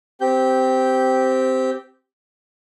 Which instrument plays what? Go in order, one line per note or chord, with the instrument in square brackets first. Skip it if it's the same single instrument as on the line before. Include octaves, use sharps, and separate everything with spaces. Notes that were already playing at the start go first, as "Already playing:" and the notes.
[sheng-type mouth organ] C4 G4 G6